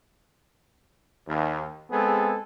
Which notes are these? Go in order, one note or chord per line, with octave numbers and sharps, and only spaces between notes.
D#2
G#3 B3 C4 G#4 A4